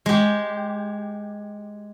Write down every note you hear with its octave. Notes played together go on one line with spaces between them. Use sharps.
G#3 G4